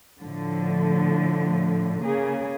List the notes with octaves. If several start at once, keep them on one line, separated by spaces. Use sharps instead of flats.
A2 D3 F3
C#3 A#3 G#4